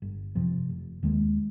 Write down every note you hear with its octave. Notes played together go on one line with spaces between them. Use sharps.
G1
F2 C3 F3
F1
D#2 D#3 G#3